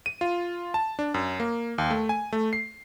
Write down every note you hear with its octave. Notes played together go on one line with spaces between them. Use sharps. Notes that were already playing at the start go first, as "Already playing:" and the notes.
D#7
F4
A5
D4
F#2
A#3
D#2
A3
G#5
A3
C7